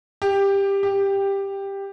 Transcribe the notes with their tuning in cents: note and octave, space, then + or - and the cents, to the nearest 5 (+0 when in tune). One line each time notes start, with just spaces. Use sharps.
G4 +15
G4 +10